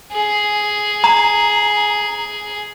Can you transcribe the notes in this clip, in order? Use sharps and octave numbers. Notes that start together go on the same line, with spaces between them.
G#4
A#5